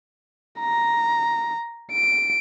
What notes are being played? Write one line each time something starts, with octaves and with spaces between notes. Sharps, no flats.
A#5
D7